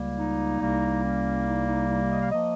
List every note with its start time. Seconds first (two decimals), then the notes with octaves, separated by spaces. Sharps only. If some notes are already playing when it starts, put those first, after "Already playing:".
Already playing: C#2 C#3 G3 A#3
0.16 D#4
0.59 C2 C3 G3 A#3
1.02 C#4
1.45 D#4
1.66 D#4
1.88 D#4
2.09 D#5
2.20 F5
2.31 F3 A#3 D#5